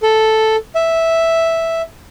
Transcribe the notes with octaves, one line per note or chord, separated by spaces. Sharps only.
A4
E5